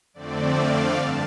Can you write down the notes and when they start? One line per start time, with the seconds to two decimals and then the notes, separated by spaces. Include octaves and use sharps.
0.14 F2 D3 A3 C4 D5
0.55 F5
0.96 G2 A5